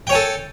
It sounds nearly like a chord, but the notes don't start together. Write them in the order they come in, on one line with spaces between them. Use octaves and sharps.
G5 C#5 G#5 A4